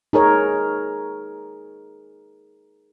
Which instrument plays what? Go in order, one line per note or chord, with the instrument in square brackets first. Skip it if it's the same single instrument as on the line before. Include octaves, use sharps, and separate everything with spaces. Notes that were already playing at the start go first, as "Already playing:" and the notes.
[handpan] D#4 G#4 A#4 C#5